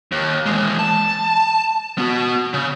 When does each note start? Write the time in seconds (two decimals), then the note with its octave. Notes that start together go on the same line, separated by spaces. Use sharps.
0.12 D#2
0.46 E3 G#3
0.79 A5
1.98 B3 F#4
2.54 C#3